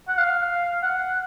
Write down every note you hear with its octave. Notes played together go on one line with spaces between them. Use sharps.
F#5
F5
F#5